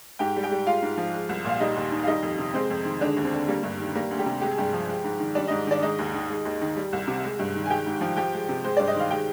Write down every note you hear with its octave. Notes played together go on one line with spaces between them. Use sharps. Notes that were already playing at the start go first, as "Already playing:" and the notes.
G#2 G4 G5
G3
G4 G5
G3
G#3 F4 F5
G#2
F3
G#3
C2
A#2 F5
G3 D#4 D#5
D#2
D#3
F5
G3 D#4 D#5
F2
C3
G#3 C4 C5
F2
D#3
D3 G#3 D4
D#2
C4
D3
G3 A#3
G2
D#3
G3 A#3
D2
G3 G4
C3
G#3 G4
G#4
G2 G3 G4
F3
G#3
G#2
D#3
G3 D4 D5
G#2 D#4 D#5
D#3 D4 D5
G#3 D#4 D#5
D#2
D#3
G#3
D#2
D#3
G3
C2
C3
G#3
G2
D#3
G#5
G#3 G4 G5
G#2
F3
F3 G4 G5
G#3
C3
G#3 C5
G2 D5
D#5
D#3 F5
G#3 G4 G5